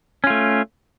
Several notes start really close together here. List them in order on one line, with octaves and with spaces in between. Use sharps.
C#4 F4 A3